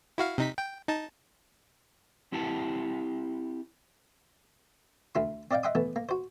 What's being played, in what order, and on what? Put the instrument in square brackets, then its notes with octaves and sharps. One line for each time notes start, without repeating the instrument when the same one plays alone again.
[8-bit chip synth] E4 F#4 F5
C3 D#4 B6
G5
D#4 A5
[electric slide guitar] C4 E4 G4 F#5 A5
[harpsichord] D2 E4 C6
C4 D5 D#5 F5 G5
D#5 E5 F#5 G5 C6 D#6
E3 A3 B3
A#3
F#4 C5